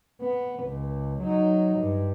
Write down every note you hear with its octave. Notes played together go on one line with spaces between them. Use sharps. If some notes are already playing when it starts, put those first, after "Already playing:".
B3
C#2
F#3 D#4
G2